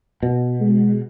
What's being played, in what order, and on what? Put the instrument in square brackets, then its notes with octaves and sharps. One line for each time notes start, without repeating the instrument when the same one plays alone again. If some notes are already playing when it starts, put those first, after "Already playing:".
[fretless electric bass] B2
[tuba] G#3